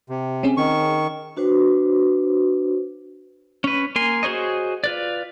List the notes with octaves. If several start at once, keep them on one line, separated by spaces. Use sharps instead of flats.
C3
C4 C#4 G#4
D#3 C#6
D4 F#4 B4 C5
C#4 B4
A#3 A#4 G#5 C6
F#4 G#4 C5 C#5 D#5
F4 B4 D5